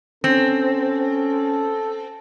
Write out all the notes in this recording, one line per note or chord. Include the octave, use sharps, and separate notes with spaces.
C4 C#4 A4